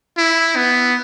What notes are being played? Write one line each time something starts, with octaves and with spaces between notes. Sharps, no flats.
E4
B3